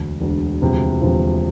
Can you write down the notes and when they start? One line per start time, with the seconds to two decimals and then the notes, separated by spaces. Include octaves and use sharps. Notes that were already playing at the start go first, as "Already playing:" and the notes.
Already playing: E1 D2 D3
0.21 E1 D2 D3
0.61 E1 D2 C3 F3
1.02 E1 D2 C3 F3